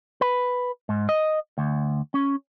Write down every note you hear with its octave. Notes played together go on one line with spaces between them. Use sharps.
B4
G#2
D#5
D2
C#4